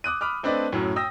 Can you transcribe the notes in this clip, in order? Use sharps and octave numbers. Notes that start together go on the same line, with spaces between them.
D6 D#6 F#6 D#7
B5 D6 D#6 F6
A3 C4 D4 B4 D5 D#5
F#2 A2 F#3
G5 D#6 E6 A#6